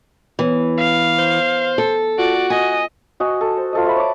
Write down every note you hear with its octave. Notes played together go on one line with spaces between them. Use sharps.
E3 B3 B4 C#5
F5
C5
A4
F4 F#4 D5
D#5 G#5
F#4 D#5 G#5
A4
C5
F4 A4 D#5
F#4 E5 B5
C#5 D6